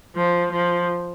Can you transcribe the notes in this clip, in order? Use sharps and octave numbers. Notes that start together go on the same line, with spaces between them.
F3
F3